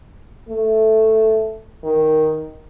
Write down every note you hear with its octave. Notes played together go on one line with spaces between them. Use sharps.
A3
D#3